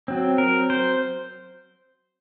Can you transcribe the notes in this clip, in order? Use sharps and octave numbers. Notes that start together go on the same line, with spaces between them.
F#3 C4
A#4
C5